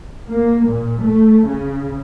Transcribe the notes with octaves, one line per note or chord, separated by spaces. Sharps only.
A#3
A#2
A3
C#3